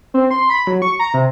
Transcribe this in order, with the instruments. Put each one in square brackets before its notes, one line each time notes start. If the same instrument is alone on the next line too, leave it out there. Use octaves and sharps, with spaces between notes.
[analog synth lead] C4
C6
B5
F#3
C#6
A#5
C3